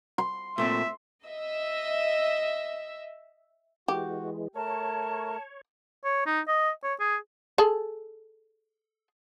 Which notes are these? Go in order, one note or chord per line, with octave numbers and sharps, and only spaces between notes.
C6
A#2 A3 C4 E5
D#5 E5
E3 G#3 F#4 G4
A3 A#4 C#5 A5
C#5
D#4
D#5
C#5
G#4
G#4 A4